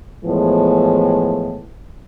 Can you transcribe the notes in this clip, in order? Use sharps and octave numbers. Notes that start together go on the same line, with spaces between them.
A2 E3 F3 G#3 B3